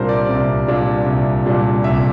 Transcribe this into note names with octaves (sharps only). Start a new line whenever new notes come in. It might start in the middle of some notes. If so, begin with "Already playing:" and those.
Already playing: C2 A#2 G3 D4 A#4 C5
D5
C2
A#2 G3 D4
C2
A#2 G3 D4
C2 E5